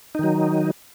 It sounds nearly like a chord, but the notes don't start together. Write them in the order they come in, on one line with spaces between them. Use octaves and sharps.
D#4 D#3 F#3